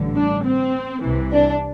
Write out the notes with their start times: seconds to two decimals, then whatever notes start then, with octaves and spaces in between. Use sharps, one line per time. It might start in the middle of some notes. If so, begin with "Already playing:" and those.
Already playing: A1 G2 D3
0.16 D4
0.45 C4
1.03 C2 C3 E3
1.32 D4